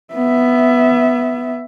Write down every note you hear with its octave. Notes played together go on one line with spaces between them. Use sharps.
B3 E5